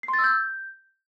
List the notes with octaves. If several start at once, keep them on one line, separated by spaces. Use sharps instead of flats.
C7
C6
A6
E6
G6